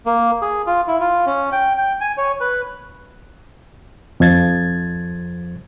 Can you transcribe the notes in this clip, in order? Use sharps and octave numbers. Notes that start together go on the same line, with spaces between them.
A#3
G#4
F4
E4
F4
C#4
G5
G5
G#5
C#5
B4
F2 F3 G#6 A6